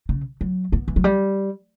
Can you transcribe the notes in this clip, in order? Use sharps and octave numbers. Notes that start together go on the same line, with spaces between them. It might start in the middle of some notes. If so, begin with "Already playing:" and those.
C#3
F#3
B3
E3
F#3
G3